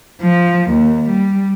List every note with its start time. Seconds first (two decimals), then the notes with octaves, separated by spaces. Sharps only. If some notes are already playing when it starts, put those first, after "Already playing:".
0.22 F3
0.71 D#2
1.09 G3